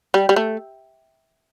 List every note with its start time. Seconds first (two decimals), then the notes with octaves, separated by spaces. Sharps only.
0.14 G3
0.29 G3
0.36 A3